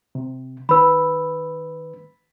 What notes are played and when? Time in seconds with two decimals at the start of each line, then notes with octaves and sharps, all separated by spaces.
0.15 C3
0.69 D#3 B4 B5 E6